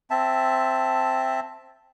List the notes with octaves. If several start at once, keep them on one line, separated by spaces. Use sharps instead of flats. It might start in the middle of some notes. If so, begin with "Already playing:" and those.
C4 E5 A5